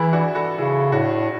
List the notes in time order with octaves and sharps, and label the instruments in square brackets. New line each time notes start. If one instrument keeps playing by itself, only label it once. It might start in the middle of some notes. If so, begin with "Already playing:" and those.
Already playing: [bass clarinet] E3 [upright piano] E4 G#4
[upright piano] D4 F#4
F#4 A4
[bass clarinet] C#3 [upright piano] E4 G#4
[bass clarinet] A2 [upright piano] D4 F#4